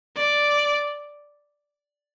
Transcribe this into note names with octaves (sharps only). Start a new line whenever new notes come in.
D5